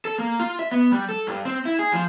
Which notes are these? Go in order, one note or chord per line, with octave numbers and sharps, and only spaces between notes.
A4
A#3
F4
E5
B3
G3
A4
G2
C4
E4
G#4
F3